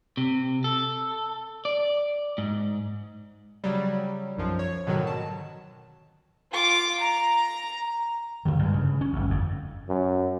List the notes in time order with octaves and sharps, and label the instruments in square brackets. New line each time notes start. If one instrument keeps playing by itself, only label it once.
[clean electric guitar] C3
A4
D5
G#2
[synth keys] C#3 F#3 G3
B1 F#2 F3
C#5
G#2 B2 D3 D#3 F#3 F#4
A5
[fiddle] F4 D6
A#5
[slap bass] C#2 B2 D3 D#3
G2 G#3
C#3
C#4
G1 D2
F2
[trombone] F#2